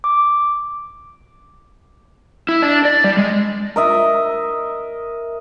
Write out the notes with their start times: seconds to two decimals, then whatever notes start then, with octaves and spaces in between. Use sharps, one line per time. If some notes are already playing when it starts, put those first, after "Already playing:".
0.04 D6
2.49 E4
2.62 D4
2.85 D5
3.04 G3
3.18 G#3
3.76 A#4 D#5 E5